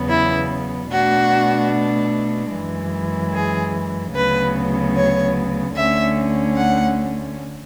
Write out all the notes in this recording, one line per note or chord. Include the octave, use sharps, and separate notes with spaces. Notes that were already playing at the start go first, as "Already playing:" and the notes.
Already playing: E2 C#3 F#3 B3
E4
B2 A3 D4 F#4
F#2 E3 G#3
G#4
D2 C#3 F#3 B3 B4
C#5
D2 D3 A3 C#4 E5
F#5